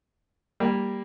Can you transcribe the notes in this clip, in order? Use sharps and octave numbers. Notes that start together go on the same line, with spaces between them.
G3 A#3